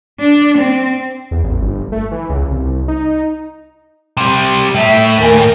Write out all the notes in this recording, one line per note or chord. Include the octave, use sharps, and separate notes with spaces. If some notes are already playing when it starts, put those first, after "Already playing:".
D4
C4
E2
A1
G1
A3
E3
C#2
C2
D#4
C3 G3
A2 E5
D#2 A#4 G#5